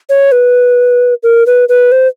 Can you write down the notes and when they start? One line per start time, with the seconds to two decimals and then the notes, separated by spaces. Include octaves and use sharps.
0.09 C#5
0.32 B4
1.23 A#4
1.47 B4
1.69 B4
1.92 C5